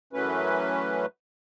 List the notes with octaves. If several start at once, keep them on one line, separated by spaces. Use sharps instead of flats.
F#2 E3 F#3 A3 C#4 B4